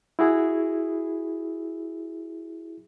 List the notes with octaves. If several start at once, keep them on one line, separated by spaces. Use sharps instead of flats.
E4 F#4 G#4